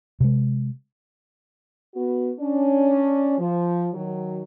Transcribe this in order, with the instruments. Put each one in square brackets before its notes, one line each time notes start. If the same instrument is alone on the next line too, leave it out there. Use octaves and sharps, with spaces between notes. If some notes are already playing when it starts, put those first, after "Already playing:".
[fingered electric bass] C3 G#3
[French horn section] B3 F#4
C#4 D4
F3
D#3 F#3